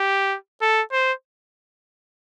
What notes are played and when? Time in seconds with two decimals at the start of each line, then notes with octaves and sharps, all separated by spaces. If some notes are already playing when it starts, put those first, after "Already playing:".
Already playing: G4
0.62 A4
0.92 C5